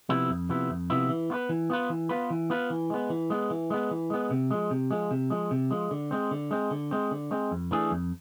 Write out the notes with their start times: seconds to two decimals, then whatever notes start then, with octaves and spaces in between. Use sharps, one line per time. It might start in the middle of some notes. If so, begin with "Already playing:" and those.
0.09 C3 F3 B3 E4
0.30 F2
0.49 C3 F3 B3 E4
0.69 F2
0.90 C3 F3 B3 E4
1.09 E3
1.30 B3 F4 B4
1.49 E3
1.70 B3 F4 B4
1.90 E3
2.09 B3 F4 B4
2.30 E3
2.50 B3 F4 B4
2.70 E3
2.90 G#3 B3
3.10 E3
3.30 G#3 B3
3.50 E3
3.70 G#3 B3
3.91 E3
4.10 G#3 B3
4.31 C3
4.51 F3 G#3
4.71 C3
4.91 F3 G#3
5.11 C3
5.30 F3 G#3
5.51 C3
5.71 F3 G#3
5.91 D3
6.11 G#3 C4
6.31 D3
6.51 G#3 C4
6.71 D3
6.91 G#3 C4
7.11 D3
7.31 G#3 C4
7.51 F2
7.71 E3 A3 D4 G#4
7.91 F2